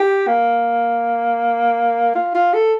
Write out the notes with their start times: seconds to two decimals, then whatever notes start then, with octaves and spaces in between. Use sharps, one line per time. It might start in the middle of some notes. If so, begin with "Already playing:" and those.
Already playing: G4
0.27 A#3
2.15 F4
2.35 F4
2.54 A4